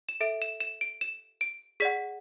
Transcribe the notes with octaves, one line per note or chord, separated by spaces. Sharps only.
E7
A4 E5 D7
E7
E7
D7
E7
D7
G#4 D5 F#5 B6